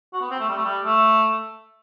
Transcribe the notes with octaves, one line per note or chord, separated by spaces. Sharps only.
F#4
B3
C4
A3
G3
A3
G3
A3